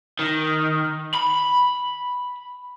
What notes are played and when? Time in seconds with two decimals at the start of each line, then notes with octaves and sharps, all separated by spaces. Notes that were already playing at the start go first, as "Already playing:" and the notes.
0.19 D#3
1.15 B5